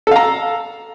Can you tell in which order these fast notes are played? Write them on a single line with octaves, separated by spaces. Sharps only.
A4 F5 A#5